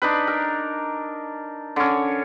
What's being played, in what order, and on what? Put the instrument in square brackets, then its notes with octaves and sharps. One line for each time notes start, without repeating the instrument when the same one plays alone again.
[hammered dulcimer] D4 D#4 B4
A#4
D3 C#4